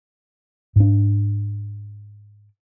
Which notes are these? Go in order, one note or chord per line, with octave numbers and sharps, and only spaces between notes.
G#2 D4